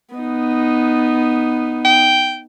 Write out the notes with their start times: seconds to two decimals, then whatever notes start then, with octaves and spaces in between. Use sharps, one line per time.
0.15 B3 D#4
1.85 G5